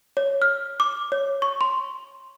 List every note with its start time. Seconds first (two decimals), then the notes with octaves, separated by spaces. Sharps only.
0.17 C#5
0.42 F6
0.80 D6
1.12 C#5
1.42 C#6
1.61 C6